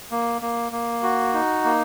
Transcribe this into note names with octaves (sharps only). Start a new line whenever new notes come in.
A#3
A#3
A#3
F#4
D#4
A#3